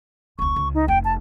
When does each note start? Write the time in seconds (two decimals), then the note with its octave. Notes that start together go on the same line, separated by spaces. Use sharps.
0.39 E1 C#2 C#6
0.56 C#2
0.74 D#4
0.88 F1 G5
1.04 A5